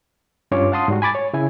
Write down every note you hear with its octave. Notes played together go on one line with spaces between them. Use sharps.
G2 C#4 F4 C#5 D6
F5 F#5 A5 C6 D#6
G#2 G3 F#4
G#5 B5 D6 A6
C#5
C#3 E4 G#5